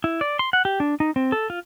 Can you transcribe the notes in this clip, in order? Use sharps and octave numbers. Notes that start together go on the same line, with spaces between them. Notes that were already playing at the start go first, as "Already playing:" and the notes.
E4
D5
C6
F#5
G4
D4
D#4
C4
A4
F4